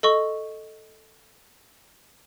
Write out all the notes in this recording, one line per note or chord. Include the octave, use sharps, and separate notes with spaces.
A4 D#5 C#6